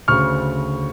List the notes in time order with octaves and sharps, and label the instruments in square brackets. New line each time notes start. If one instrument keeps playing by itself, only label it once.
[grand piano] D2 C#3 C#6 F6